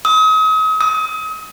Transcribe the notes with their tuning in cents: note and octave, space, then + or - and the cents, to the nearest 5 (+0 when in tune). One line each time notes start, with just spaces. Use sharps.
D#6 +40
D#6 +35